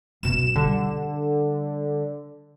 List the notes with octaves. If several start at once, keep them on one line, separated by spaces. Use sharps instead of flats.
F#2 B2 E7
D3 G3